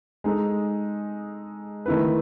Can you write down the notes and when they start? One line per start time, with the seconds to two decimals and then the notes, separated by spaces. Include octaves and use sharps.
0.24 G#3 D#4 A4
1.86 D#3 A3 E4 B4